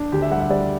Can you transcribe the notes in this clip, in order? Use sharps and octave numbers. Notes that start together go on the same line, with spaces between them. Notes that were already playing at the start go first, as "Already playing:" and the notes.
Already playing: D4
D2 G4
E5
G3 F#5
E5
G3 D5